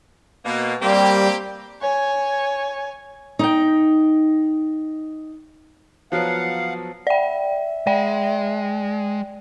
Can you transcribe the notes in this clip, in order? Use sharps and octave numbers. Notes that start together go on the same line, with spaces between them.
B2 A#3
G3 A#3 C4 G4
C#5 G#5
D#4 G5
F3 F#3 B3 F5 F#5
D5 E5 G5
G#3 D5 G5